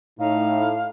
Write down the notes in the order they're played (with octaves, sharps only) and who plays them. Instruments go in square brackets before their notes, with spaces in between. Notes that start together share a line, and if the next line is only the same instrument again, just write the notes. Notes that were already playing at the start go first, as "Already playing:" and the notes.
[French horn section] A2 [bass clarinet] D#4 [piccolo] F5